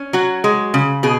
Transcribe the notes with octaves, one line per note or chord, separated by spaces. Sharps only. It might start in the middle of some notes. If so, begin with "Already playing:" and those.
Already playing: C#4
F#3 F#4
G#3
C#3
B2 G#4